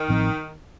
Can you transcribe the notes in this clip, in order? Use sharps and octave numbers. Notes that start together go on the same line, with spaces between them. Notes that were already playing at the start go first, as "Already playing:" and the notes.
Already playing: D#3
A1 A2 F3 C4